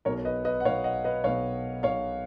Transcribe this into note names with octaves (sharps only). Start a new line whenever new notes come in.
B1 B2 A#4 C#5
B4 D#5
B4 D#5
F#5
B1 B2 C#5 F5
D#5 F#5
B4 D#5
B1 B2 C#5 F5
B1 B2 C#5 F5